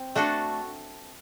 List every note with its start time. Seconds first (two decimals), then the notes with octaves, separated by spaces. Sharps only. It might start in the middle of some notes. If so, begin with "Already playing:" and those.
Already playing: C4
0.16 A3 D4 F#4 A4